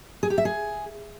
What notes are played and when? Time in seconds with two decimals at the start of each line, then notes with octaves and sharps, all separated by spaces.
0.23 G#4
0.30 G4
0.38 E5
0.45 G#4